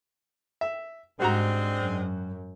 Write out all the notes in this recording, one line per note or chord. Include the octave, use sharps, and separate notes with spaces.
E5
G#2 G3 G#3 C4 D4 F#4 A#5
F#2